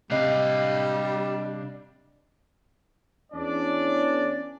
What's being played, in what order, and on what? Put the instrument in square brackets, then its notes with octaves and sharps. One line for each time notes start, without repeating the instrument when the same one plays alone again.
[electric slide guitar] C3 [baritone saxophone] G3 [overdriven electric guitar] D4 F5 [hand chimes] D#5 F#6
[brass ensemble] E2 C#4 D4 D5